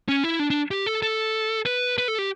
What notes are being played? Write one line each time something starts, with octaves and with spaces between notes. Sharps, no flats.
C#4
E4
D4
D4
G4
A4
A4
B4
B4
A4
G4